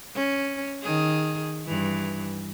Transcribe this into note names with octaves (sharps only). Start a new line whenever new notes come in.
C#4
D#3 G#4
G2 E3